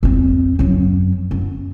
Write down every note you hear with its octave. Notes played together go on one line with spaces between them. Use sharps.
F2 C4
F#2 F#3
F#2